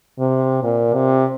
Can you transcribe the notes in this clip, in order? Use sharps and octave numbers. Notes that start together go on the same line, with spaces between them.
C3
A#2
C3